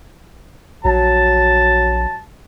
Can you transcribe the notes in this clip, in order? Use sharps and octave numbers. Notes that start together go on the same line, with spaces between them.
A#1 F#3 A5